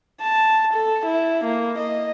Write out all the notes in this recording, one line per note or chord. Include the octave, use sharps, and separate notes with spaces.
A5
A4
E4
A#3
D#5